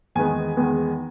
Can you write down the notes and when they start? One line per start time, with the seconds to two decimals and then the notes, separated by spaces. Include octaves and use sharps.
0.15 E2 D#3 G#3 B3 G#5
0.56 E2 D#3 G#3 B3